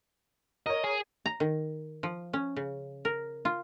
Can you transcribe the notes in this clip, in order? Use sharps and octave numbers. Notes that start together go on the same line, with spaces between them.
A#4 C#5 D#5
G#4
A#5
D#3
F3
C#4
C#3
A#4
F4